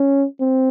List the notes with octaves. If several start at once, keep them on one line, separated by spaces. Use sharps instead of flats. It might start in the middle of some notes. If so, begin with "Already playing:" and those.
Already playing: C#4
C4